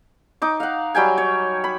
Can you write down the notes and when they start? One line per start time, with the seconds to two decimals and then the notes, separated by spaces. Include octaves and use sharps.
0.42 D#4 D6
0.60 F5 F#5
0.95 F#3 G3 G5 G#5
1.18 C#5
1.64 B5